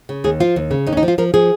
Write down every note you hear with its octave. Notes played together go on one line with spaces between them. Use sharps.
C#3
D#2 G#4
F3 F4
D#2
C#3
D#2 D#4
C#4
D#4
F3
F4
F3 A#4
F3 G#4